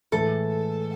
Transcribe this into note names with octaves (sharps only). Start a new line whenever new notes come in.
A2 E3 G#3 A4